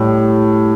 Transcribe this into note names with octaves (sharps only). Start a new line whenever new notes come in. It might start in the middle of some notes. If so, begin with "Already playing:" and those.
Already playing: A2 G3